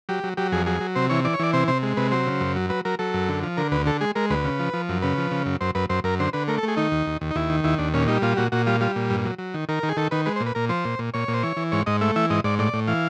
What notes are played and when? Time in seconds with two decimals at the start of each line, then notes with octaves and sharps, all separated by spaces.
0.09 F#3 G4
0.24 F#3
0.37 F#3 G4
0.52 F2 G#4
0.66 F#3 G#4
0.81 F#3
0.95 C3 C5
1.10 E3 C#5
1.24 E3 D5
1.34 C#5
1.39 E3 D5
1.53 C3 C5
1.68 C3 C5
1.83 G#3
1.97 C3 B4
2.12 F#3 C5
2.27 C#3
2.41 F#2
2.56 F#3
2.70 F#3 B4
2.85 F#3 A#4
2.99 F#3 A4
3.14 F#2
3.29 D3
3.43 F3
3.57 D3 A#4
3.72 D2 B4
3.86 D3 A4
4.01 G#3 G#4
4.15 G#3 A#4
4.30 D2 B4
4.44 C#3
4.59 F3
4.74 F3
4.89 F#2
5.02 C#3 B4
5.18 F3
5.31 C#3
5.46 F#2
5.61 F#2 C5
5.75 F#2 B4
5.90 F#2 C5
6.04 F#2 A#4
6.20 D3 C5
6.33 D3 B4
6.48 A3 A#4
6.58 A4
6.63 A3 G#4
6.77 D#3 D#4
6.92 D#2
7.06 D#2
7.21 D#2
7.31 D#4
7.35 D#2 E4
7.50 D#3
7.64 D#2 E4
7.79 D#2 D4
7.94 A#2 C#4
8.08 G3 D#4
8.22 A#2 F4
8.37 A#2 F#4
8.52 A#2 F#4
8.67 G3 F4
8.80 G3 F4
8.96 A#2
9.10 G2
9.25 F#3
9.38 F#3
9.54 D#3
9.69 D#3 A#4
9.83 D#3
9.89 G#4
9.97 D#3 A4
10.11 D#3 B4
10.26 G#3 B4
10.36 C5
10.40 A#2
10.46 B4
10.55 A#2 A#4
10.69 F3 C5
10.85 A#2
10.99 A#2
11.14 A#2 C#5
11.28 A#2
11.34 C5
11.43 E3 C#5
11.57 E3
11.72 G#2 C#5
11.86 G#2 D#5
12.01 A3 E5
12.16 E3 E5
12.30 G#2 D#5
12.44 G#2 D5
12.59 A2 D5
12.74 A2
12.87 E3 F5